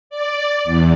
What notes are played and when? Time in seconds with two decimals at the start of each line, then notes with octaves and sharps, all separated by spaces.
0.10 D5
0.64 E2